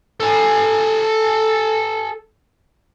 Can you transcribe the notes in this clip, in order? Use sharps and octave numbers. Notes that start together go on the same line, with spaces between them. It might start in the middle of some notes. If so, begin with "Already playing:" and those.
A4 G#5